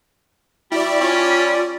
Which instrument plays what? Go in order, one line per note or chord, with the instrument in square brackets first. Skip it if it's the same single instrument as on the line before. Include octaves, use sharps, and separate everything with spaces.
[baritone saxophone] G3 [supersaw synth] E4 D5 [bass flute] F#4
[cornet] C#4 [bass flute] F4 [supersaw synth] D5